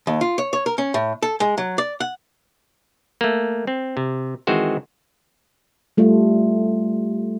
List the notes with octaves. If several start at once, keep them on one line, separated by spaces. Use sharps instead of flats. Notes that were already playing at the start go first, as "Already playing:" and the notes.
D#2
F4
C#5
C#5
A#4
C#4
A2
A4
G#3
F#3
D5
F#5
A3 A#3
C4
C3
D#3 E3 G#3 C4 F#4 C5
G3 A3 F4